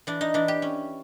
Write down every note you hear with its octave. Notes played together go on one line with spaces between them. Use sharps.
E3 D4
D#4
E3 D4
G4
C#4